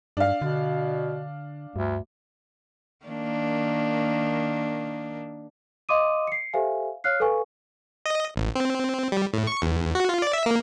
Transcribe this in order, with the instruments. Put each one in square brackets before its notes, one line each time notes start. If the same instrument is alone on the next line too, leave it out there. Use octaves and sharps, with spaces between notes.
[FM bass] G2 [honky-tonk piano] D4 F5
[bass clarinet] B2 [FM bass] D3
[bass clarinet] D2 [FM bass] G2
[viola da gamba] D#3 A#3 D4
[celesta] D#5 F5 C6 D6 D#6 D#7
C7 C#7
G4 A4 C5 E5 F5 G#5
C#5 F5 F6 F#6 C7
A4 B4 F5 G#5 C#6
[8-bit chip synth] D#5
A1
C4
G3
A2
C#6
E2
F#4
F4
D5
E5
A#3